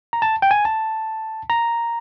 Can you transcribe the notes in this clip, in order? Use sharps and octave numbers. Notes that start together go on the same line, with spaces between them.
A#5
A5
G5
G#5
A5
A#5